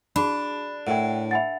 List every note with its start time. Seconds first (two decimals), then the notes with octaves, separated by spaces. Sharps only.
0.16 D4 F#4 G#4 A5 B5
0.87 A2 A#4 D5 F#5 G5
1.31 E5 F#5 G#5 B5 A6